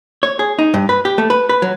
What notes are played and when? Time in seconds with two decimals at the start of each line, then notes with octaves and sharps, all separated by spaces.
0.23 C#5
0.39 G#4
0.59 D#4
0.74 G2
0.89 B4
1.05 G4
1.18 A3
1.30 B4
1.49 B4
1.62 F#3